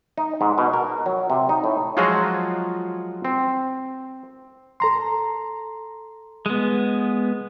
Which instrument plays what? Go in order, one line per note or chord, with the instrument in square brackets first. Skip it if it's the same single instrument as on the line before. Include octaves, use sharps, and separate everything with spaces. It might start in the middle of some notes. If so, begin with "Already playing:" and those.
[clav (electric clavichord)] D#4
G#2
B2
A#4
F#3
C3
D#4
A2
F3 F#3 G#3 F4 F#4 G#4
C4
[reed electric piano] A4 A#5 C6
[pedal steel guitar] G#3 B3